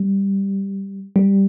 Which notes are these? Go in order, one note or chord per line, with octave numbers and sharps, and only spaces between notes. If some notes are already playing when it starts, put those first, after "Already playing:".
Already playing: G3
G3